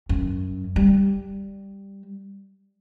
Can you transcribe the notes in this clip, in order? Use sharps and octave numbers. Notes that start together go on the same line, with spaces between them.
F#2
G3